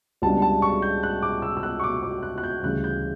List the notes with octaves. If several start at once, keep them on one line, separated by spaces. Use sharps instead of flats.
C#2 C#3 G3 B3 D4 A5
A5
C#6
G6
F#6
D6
E6
E6
F#6
C#6
D6
D6
F#6
F#6
G6
D2 C#3 E3 G3 F#6
G6